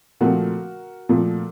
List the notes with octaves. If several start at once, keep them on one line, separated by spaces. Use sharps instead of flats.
A#2 F3 A3 C4 F#4 A#4
A#2 F3 A3 C4